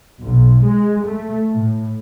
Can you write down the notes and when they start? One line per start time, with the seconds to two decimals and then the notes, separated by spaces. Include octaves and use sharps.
0.21 B1
0.62 G#3
1.07 A3
1.50 A2